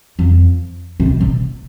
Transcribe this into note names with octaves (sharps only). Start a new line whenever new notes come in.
F2
C3
B2
B2